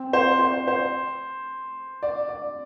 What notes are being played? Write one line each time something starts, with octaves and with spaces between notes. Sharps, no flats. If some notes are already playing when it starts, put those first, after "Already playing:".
Already playing: C4
C5
C5
C5
D5
D5